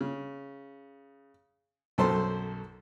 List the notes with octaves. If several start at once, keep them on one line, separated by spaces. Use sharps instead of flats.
C#3
B1 F#2 A4 C5 A5 C6